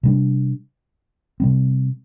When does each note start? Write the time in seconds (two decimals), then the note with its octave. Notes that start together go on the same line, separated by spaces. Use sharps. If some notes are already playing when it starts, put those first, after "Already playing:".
0.03 C3 G3 D4
1.40 C3 G3 C4